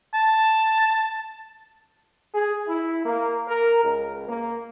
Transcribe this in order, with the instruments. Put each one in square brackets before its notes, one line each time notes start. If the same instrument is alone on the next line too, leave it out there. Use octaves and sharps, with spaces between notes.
[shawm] A5
[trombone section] G#4
E4
A#3
A#4
C#2
A#3